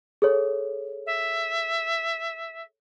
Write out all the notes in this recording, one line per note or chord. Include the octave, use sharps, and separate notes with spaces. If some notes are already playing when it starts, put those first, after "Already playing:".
G#4 A4 C#5
E5